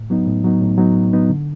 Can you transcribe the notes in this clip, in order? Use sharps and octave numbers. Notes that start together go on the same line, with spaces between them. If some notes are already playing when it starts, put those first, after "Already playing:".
Already playing: A2
F#3 B3 D#4
A2
F#3 B3 D#4
A2
F#3 B3 D#4
A2
F#3 B3 D#4
D3